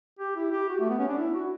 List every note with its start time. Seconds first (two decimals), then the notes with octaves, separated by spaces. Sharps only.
0.19 G4
0.36 E4
0.52 G4
0.69 F#4
0.80 A3
0.90 B3
0.98 C#4
1.08 D4
1.18 E4
1.35 F#4